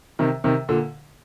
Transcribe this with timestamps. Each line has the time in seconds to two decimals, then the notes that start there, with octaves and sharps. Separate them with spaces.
0.19 C3 D#3
0.44 C3 D#3
0.69 A#2 D3